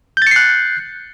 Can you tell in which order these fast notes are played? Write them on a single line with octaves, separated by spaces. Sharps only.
G6 A6 C#7 C7 F#6